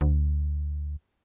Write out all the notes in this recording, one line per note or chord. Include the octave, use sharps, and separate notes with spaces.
D2